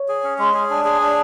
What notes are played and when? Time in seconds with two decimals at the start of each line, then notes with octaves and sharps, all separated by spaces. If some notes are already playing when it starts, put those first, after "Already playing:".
Already playing: C#5
0.08 G#4
0.24 C#4
0.39 G#3
0.54 G#4
0.70 D4
0.85 G#4
1.01 D4